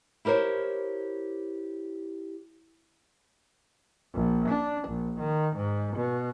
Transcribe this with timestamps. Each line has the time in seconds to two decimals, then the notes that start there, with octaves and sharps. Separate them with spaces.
0.25 E4 G4 A#4 C5 C#5
4.14 A#1
4.49 D4
4.88 A#1
5.19 D#3
5.56 G#2
5.96 B2